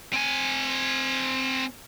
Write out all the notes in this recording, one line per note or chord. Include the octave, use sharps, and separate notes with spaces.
C4 G#5